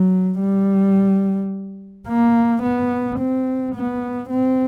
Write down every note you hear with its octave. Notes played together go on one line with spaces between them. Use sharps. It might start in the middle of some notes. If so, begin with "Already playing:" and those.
Already playing: F#3
G3
A#3
B3
C4
B3
C4